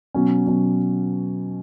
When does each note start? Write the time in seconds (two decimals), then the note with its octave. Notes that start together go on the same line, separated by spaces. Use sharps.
0.14 B2 F#3 C#4
0.46 B2 F#3 C#4